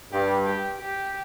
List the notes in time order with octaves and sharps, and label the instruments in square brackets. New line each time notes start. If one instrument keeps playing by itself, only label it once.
[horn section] G2 [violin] G4
[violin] G4
G4